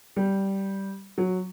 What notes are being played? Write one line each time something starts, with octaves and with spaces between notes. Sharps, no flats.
G3
F#3